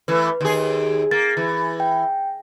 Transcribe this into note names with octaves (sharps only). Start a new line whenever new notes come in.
E3 A3 B4
D#2 G#4
A#3 A6
E3
G5